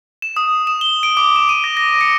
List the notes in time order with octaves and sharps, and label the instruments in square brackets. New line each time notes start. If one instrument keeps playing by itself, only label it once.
[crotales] E7
D#6
E7
G7
D7
D6
E7
D#7
A#6
A#6
C#7